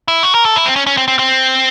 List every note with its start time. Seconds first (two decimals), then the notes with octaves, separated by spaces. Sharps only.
0.08 E4
0.23 F#4
0.35 A#4
0.45 A4
0.56 E4
0.66 C4
0.76 C#4
0.87 C#4
0.97 C4
1.08 C4
1.19 C4